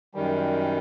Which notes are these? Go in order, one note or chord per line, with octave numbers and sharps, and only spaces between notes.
F#2 D#3 G3